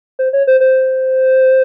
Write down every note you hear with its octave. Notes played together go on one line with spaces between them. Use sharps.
C5
C#5
C5
C5